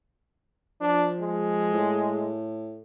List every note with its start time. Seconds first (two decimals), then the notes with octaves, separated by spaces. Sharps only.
0.81 F3 D4
1.20 G#3
1.72 A2